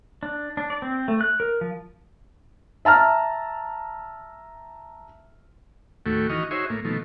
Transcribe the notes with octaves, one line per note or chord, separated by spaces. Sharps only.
D4
D4
D5
C4
A3
F#6
A#4
F3
E5 A5 A#5 F6
D#2 A2 A3 F#4 G5
D#3 E3 F#4 D#5 C#6 F6
D#4 F#4 G#4 C5 C#5 E5
A2 A#3
B2 D#3 F3 A3